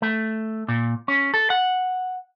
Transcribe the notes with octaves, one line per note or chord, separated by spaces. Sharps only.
A3
A#2
C#4
A4
F#5